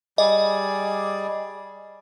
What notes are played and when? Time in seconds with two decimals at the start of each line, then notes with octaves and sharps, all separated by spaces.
0.18 G3 G#4 D5 D#5